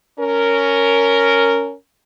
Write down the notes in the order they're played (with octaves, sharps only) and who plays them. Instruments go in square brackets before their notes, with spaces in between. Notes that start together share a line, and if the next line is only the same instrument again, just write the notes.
[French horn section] C#4 A#4